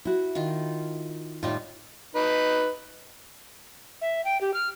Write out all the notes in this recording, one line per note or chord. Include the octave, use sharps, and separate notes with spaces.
E4 F#4
D#3 F4
A2 G3 D#4 F4
D#4 B4
E5
G5
G4
F6